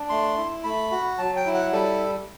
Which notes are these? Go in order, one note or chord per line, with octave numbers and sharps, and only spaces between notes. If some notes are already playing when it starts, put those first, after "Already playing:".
Already playing: D4
A3 C6
E4
A3 B5
F#4
F#3 A5
G5
E4
F#5
G3 A4